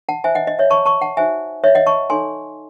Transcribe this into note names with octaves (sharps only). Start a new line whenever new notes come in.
F#5 A5
E4 C5 E5 G#5
D#5 F#5
D#5
C#5 E5
A5 C#6
A5 C#6
F#5 A5
D#4 F#4 C5 E5 G#5
C#5 E5
D#5 F#5
A5 C#6
D#4 A4 C#5 G#5 C6